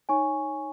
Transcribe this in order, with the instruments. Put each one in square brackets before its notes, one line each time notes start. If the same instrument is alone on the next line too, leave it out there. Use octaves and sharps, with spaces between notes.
[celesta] D#4 C#5 G#5 C#6